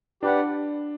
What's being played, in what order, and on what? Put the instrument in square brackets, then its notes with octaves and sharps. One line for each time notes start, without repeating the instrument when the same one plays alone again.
[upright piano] D4 [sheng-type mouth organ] G4 B4 D5 F#5